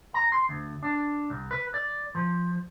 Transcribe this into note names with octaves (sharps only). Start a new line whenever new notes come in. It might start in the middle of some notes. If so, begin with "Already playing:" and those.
A#5
C6
D2
D4
C2
B4
D5
F3